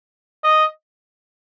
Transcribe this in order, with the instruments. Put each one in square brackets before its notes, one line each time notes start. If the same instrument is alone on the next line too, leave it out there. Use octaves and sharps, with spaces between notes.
[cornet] D#5